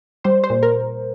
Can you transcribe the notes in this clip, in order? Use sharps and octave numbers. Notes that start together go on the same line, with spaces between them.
G3 C5
C5
A#2
A#4